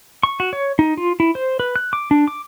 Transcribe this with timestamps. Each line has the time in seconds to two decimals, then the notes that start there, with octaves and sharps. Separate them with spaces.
0.23 C#6
0.40 F#4
0.53 C#5
0.79 D#4
0.97 F4
1.20 E4
1.35 C5
1.60 B4
1.76 F#6
1.93 D6
2.11 D4
2.28 D6